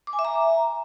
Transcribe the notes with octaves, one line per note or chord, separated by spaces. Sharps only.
D6
G#5
E5
A#5